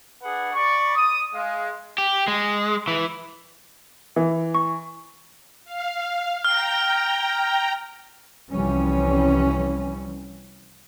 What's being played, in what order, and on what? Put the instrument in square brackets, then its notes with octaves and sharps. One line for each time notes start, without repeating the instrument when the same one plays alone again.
[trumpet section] D4 G#4 B4 F#5
D5 B5 C#6
D#6
G#3 F5
[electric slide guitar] G4
G#3
E3
[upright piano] E3
[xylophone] C#6
[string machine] F5
[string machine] G5 A#5 [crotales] F6
[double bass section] C2 E3 F3 G3 C#4